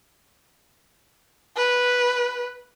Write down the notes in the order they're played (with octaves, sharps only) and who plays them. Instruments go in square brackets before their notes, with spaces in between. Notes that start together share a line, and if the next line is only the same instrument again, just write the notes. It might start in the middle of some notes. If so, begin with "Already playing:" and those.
[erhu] B4